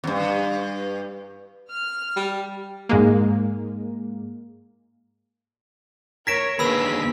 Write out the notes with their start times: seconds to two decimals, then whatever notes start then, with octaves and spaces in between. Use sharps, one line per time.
0.04 E2 G2
1.71 F6
2.16 G3
2.89 G#2 G#3 A#3
6.27 A#4 C#5 G#6 A#6 B6 D7 E7
6.59 D#2 D3 G#4 B4 B5 E6 B6